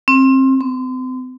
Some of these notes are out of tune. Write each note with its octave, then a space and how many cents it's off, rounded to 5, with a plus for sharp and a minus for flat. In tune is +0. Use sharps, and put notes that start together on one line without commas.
C4 +25
C4 -35